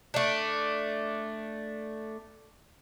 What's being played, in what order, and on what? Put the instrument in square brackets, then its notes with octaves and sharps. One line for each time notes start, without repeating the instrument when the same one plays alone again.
[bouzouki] A3 D4